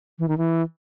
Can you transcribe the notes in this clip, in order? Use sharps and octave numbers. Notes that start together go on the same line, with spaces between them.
E3
D#3
E3